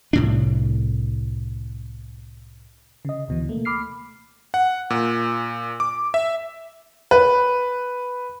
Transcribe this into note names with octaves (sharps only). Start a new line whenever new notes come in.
C2 A2 D4
C#3 D#5
D2 B2 E3
A3 A#3
B5 D6 F6 C7
F#5
A#2
D6
E5
B4